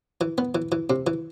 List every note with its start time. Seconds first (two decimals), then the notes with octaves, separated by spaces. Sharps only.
0.21 E3
0.38 B3
0.55 E3
0.72 E3
0.90 C3
1.07 E3